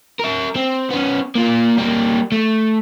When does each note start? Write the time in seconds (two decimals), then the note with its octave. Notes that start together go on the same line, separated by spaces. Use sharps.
0.20 A#4 E5
0.56 C4
0.90 B3 C#4
1.35 A#3 F4
1.78 G3 A#3
2.32 A3